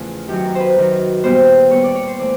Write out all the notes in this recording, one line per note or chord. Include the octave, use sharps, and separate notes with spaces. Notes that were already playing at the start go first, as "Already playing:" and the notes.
Already playing: E2 C#3 F3 A3 F4
F#2 D#3 F#3 G4
A#4
B4 C5
F#2 D#3 F#3
A#2 G3 B3 C5
A#2 G3 B3 C#5
D5
C#5
C5
E3 A3 D5